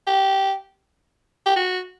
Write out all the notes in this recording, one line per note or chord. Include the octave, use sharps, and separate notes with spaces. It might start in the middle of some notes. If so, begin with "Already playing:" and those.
G4
G4
F#4